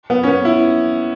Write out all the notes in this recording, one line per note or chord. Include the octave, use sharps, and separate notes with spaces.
B3
C#4
B3
E4